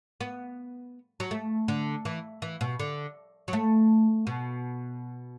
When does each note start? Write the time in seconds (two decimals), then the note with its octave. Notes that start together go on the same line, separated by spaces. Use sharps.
0.21 B3
1.20 F#3
1.31 A3
1.68 D3
2.05 E3
2.42 E3
2.61 B2
2.79 D3
3.48 F#3
3.53 A3
4.27 B2